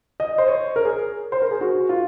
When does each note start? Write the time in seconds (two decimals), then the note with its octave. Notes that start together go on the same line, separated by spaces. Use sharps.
0.20 D#5
0.38 C5
0.48 C#5
0.76 A#4
0.85 G#4
1.32 C5
1.42 A#4
1.51 G#4
1.61 F#4
1.89 F4